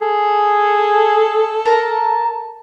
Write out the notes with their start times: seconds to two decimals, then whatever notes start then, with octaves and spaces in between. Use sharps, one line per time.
0.02 G#4 A4
1.66 A#4 A5 A#5